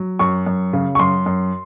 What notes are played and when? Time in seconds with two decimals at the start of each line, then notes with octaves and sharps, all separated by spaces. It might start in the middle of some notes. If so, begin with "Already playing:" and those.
Already playing: F#3
0.19 F#2 C#6
0.46 F#2
0.73 C#3
0.95 C#6
0.99 F#2 C6
1.26 F#2